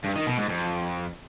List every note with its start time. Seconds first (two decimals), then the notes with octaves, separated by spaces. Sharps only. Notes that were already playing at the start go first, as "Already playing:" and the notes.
0.04 G2
0.15 D#3
0.27 B2
0.38 G#2
0.49 F2